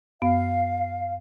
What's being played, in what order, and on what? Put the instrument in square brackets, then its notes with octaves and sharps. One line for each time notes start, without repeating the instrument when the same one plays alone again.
[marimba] F#2 B3 [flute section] F5